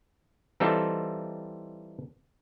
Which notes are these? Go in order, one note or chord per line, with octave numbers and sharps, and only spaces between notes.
E3 G3 C4 D#4 F4 A4